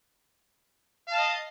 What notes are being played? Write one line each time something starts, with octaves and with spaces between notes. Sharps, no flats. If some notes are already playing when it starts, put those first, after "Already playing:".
D#5 F5 A5